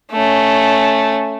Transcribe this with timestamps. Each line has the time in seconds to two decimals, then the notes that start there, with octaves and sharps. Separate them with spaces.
0.12 A3 C#4